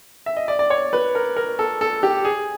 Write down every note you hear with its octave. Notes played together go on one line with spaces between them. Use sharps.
E5
D#5
D5
D5
C#5
B4
A#4
A#4
A4
A4
G4
G#4